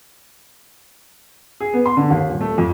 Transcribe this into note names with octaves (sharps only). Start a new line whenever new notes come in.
G#4
B3
C6
D3
D#2
D#1
A3
F2